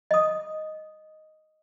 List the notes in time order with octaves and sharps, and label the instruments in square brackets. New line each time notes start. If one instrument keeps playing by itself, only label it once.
[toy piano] D#5 D#6